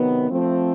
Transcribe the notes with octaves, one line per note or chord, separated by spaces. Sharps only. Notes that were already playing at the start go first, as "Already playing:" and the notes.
Already playing: C3 D#3 F#3 B3
F3 A3 C4